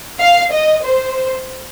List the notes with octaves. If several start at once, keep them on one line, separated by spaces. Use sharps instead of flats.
F5
D#5
C5